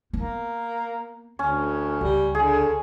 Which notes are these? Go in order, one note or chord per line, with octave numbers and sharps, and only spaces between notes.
A#3 B3
D2 C#4
C#2 G3
D3 G#4